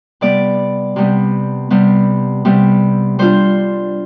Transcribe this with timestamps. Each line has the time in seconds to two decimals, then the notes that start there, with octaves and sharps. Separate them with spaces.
0.21 C3 G3 B3 D5
0.96 C3 G3 B3
1.71 C3 G3 B3
2.45 C3 G3 B3
3.19 G3 D4 F4 C5